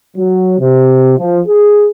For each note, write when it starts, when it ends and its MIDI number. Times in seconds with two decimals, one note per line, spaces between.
0.16 0.58 54
0.60 1.13 48
1.18 1.40 53
1.48 1.88 68